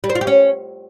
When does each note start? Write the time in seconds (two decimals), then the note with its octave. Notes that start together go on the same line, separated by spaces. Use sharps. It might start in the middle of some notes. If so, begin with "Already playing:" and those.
0.04 G3
0.10 C5
0.15 F4
0.21 G4
0.27 C#4